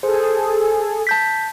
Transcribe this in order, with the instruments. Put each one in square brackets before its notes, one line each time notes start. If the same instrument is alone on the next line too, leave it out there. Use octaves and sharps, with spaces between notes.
[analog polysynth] G#4 A4 [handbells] C5
[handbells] A5 G6 B6